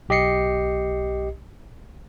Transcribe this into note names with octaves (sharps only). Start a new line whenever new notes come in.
B1 G4 D#5 C7 C#7